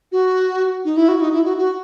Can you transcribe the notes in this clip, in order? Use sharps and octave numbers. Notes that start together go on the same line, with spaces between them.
F#4
D#4
E4
F#4
D#4
E4
F#4
F#4